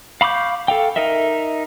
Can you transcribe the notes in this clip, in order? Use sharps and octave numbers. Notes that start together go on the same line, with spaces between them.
F5 B5 C#6 D6 G6
A4 F5 G5
D#4 A#4 D#5 E5